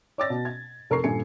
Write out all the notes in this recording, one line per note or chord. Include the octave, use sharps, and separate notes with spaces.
C#5 D5 D6 E6 A6 A#6
B2
G#6
F1 A4 A#4 A#5 C#6 C7
D#1 G2 A#2 A4 G#5 C#7